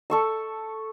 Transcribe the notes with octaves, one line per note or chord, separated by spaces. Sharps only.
A4 C#6 E6